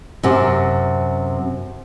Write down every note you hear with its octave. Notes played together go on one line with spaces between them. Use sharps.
F#2 C3